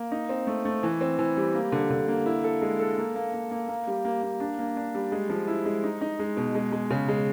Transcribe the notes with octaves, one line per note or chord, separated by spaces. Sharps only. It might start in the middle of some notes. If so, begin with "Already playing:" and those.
Already playing: A#3
D#4
C4
A3
A3
E3
C4
E3
G3
A#3
D3
D3
A#3
E4
A4
G#3
A4
A#3
A#3
A#3
A#3
A#3
G3
A#3
A#3
D4
A#3
D4
G3
G#3
F3
E4
G#3
D#4
D#4
G#3
B2
G#3
G#3
C#3
G#3